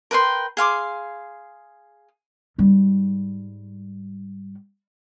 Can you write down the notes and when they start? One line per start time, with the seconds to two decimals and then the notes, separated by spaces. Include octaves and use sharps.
0.11 A#4 B4 G5 C6
0.57 G#4 F5 C6 D6
2.58 G#2 G3